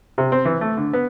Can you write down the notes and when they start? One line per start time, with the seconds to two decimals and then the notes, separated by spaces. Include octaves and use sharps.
0.18 C3
0.32 C4
0.45 E3
0.61 A3
0.77 D3
0.93 B3